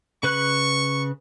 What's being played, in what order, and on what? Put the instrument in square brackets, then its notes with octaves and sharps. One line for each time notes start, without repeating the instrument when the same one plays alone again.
[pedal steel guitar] C#3 B4 F#6 [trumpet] C#6